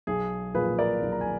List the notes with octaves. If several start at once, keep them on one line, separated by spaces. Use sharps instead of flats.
B1 G#4
A#2 F3 A#3 G#4 B4
A#4 D5
B1
A#5
G#5